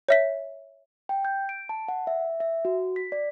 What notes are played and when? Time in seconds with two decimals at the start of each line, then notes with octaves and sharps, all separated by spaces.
0.09 C#5 E5 B6
1.09 G5
1.25 G6
1.49 D7
1.69 A5
1.88 F#5
2.07 E5
2.40 E5
2.65 F#4
2.96 B6
3.12 D5